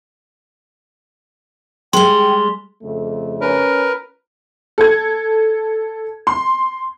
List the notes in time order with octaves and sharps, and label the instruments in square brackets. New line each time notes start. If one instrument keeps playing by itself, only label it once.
[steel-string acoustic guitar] G3 G#3 [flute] G5 [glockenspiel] C6 G7
[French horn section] F2 C#3 A3
[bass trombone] C#4 [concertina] A#4 B4
[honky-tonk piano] A4 G#6
C6